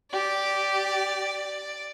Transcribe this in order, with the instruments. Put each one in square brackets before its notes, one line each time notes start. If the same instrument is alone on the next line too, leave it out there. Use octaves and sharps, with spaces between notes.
[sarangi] G4 [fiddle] D5